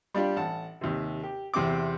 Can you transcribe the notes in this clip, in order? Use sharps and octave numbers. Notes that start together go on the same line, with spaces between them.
G3 D4 F4 G4
A1 F#5 A5
D#2 C3
G4
E2 C3 C4 G5 D6